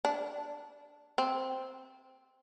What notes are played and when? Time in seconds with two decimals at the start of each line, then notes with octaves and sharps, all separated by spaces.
0.05 D4
1.18 C4